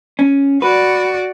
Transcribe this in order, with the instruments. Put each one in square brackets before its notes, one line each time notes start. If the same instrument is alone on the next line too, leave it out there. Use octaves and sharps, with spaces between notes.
[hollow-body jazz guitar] C#4
[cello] F#4 D5 [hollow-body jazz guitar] B4